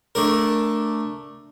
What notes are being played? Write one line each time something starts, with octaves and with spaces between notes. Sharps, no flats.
A3 D4 A#4